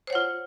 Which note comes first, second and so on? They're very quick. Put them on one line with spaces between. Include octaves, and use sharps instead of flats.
C5 C#5 F#5 F4